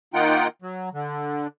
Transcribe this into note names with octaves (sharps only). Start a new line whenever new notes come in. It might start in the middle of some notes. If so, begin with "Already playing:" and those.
D#3 A#3 D#4 F4 F#5 G5
F#3
D3